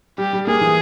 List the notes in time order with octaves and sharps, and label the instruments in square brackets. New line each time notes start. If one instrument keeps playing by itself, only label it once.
[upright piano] G3 [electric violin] G4
[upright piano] G3
[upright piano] A#3 [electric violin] G#4
[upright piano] E3